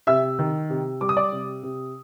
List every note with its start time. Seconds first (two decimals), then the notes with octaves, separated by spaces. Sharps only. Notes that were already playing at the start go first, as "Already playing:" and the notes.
0.07 C3 E5 E6
0.39 D#3
0.70 C3
1.01 G3 D6
1.09 D#6
1.17 D5 D6
1.32 C3
1.63 C3